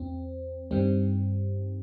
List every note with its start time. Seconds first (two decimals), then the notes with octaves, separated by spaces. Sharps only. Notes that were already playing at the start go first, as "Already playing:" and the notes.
Already playing: E2 C4
0.71 G2 D#3 G3 C4